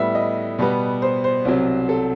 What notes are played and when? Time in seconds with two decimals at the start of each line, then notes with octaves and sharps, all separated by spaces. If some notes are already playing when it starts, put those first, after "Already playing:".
Already playing: A2 G3 B3 E5
0.15 D#5
0.59 B2 G3 B3
1.02 C5
1.24 C5
1.45 C2 C3 F#3
1.89 A4